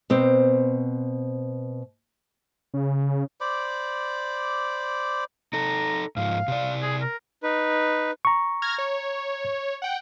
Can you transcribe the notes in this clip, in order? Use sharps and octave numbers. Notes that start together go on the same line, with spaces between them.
B2 C4 C5
C#3
C5 D5 B5 D6
D#4 A4 A#5
G#2 F3 F5
C3 D5
G#4
A#4
D#4 B4
A#5 C#6
F6 G#6 A#6
C#5
F#5 G5